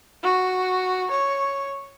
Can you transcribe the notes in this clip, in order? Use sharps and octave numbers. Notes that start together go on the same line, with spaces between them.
F#4
C#5